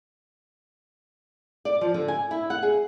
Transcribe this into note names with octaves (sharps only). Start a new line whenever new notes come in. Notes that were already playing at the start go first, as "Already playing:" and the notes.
D5
F3
D3
G#5
E4
F#5
G#4